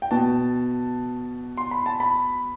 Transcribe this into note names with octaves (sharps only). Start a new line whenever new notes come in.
G5
B2 A5
C6
B5
A5
B5